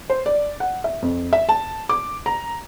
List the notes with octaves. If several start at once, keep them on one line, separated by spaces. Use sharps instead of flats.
C5
D5
F#5
E5
F2
E5
A5
D6
A#5